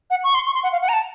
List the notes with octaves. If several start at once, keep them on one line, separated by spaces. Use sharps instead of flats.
F#5
C#6
C6
C#6
C6
F#5
F5
F#5
A#5
A5